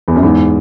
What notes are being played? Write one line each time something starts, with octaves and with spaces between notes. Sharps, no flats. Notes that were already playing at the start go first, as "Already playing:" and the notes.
E2
F#2
E2 G#2